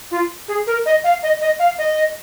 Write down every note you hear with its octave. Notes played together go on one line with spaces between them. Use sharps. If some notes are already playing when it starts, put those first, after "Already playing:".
F4
G#4
A#4
D#5
F5
D#5
D#5
F5
D#5